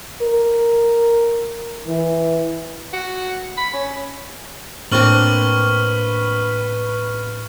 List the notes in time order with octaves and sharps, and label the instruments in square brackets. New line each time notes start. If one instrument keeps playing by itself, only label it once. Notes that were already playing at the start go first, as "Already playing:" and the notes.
[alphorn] A#4
E3
[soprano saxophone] F#4
B5
C#4
[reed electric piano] A2 [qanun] A#3 C4 D4 [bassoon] B4 [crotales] C#6 F6 F#7